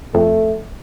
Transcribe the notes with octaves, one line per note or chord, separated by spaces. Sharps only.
F2 A3